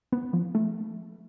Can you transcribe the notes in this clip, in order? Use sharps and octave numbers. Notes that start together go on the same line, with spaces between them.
B3
F3
A3